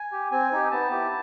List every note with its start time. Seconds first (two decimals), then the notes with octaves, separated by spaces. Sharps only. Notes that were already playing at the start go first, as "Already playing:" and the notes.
Already playing: G#5
0.12 G4
0.32 C4 G#5
0.52 D#4 G4
0.71 B3 A5
0.91 E4 G4